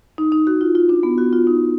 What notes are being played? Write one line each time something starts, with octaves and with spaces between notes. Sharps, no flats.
D#4
D#4
F#4
F4
F4
D4
B3
F#4
F4
D#4